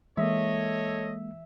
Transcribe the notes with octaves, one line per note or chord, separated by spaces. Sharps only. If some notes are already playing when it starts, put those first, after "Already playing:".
E3 G#3 A#3 A4 C#5 D#5 E5